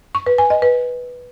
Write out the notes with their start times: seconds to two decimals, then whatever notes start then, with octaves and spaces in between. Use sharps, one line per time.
0.15 C#6
0.27 B4
0.38 G#5
0.50 D#5
0.62 B4